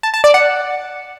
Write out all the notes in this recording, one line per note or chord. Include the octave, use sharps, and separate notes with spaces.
A5
A5
D5
F#5